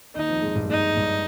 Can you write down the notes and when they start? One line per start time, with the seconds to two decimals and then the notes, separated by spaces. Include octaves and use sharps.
0.15 D#2 D#3 D#4
0.29 F2 F3
0.42 G#2 G#3
0.55 G2 G3
0.64 A#3
0.70 G#2 G#3 D#4
0.96 G2 G3